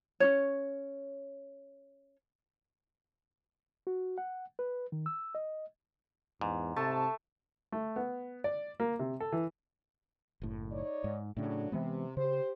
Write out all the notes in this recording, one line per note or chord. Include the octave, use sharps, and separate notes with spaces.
C#4 D4 C#5
F#4
F#5
B4
D#3
E6
D#5
E2 G#2
C3 A3 A5
A3
B3
D5
A#3
C3
A4
E3
F#1 A2
D#4 C#5 D5
G#2
A2 C#3 F#3 A3 D4
C3 E3 G#3 B3
C#3 G4 C5